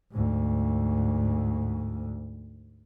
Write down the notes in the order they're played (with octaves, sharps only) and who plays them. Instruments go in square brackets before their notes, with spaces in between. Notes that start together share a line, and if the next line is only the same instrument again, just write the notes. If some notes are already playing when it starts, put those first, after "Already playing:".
[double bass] D2 G#2